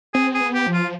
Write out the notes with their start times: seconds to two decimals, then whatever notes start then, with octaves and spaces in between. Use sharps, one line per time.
0.14 C4 G#4
0.34 G#4
0.41 B3
0.54 G4
0.67 F3
0.73 F4